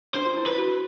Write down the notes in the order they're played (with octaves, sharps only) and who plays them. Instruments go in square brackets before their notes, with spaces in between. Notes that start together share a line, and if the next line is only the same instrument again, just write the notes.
[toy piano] D4 [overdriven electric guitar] C5
[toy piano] F4
E4
[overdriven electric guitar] B4
[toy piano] F#4